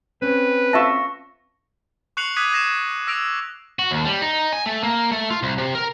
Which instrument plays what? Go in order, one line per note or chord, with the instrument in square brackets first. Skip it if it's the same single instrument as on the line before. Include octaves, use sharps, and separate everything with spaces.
[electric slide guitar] C4 C#4 [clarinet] B4
[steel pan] F4 E5 A5 [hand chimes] C#6 A#6
[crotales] C#6 F#6 C7 C#7 F7 F#7
D6 D#6 F#6 G#6 B6 D#7
F#6 G#6 A#6 C7 E7
E6 A#6 D7 F7
[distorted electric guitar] F#4
D#2
G3
D#4
G#5
A3
A#3
A3
F4
C2
C3
A#4